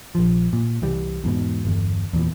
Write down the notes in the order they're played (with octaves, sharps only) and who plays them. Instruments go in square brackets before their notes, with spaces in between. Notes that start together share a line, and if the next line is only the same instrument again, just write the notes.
[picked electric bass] A#1 F3
A#2
C2 E3 G3
E2 G#2 B2
G1 E2
E2 A#2 E3